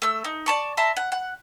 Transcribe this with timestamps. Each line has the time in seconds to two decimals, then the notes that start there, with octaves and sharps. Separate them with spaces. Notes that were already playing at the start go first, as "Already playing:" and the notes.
0.02 A3 E6
0.24 D#4
0.46 D5 A5 C#6
0.77 E5 A5 A#5 C6
0.96 F#5
1.12 F#5